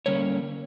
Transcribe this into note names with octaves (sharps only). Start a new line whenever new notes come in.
D3 G3 A#3 C#4 C#5